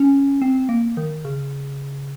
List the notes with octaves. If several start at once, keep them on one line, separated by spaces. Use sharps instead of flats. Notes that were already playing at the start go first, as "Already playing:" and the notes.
Already playing: C#4
C4
A#3
D#3
C#3